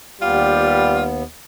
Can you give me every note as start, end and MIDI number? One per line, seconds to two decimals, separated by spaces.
0.22 1.23 39
0.22 1.10 55
0.22 1.23 59
0.22 1.03 65